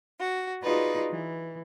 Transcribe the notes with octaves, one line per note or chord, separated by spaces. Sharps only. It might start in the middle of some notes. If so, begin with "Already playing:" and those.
F#4
D#4 F4 F#4 G#4 B4 D5
E3